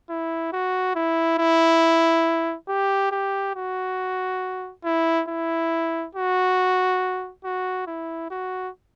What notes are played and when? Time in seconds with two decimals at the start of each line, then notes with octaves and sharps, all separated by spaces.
0.10 E4
0.53 F#4
0.95 E4
1.39 E4
2.69 G4
3.12 G4
3.56 F#4
4.84 E4
5.28 E4
6.15 F#4
7.45 F#4
7.87 E4
8.31 F#4